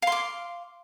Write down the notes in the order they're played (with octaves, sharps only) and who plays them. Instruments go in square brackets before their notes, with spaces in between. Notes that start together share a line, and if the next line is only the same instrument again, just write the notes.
[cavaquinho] F5
C6
D6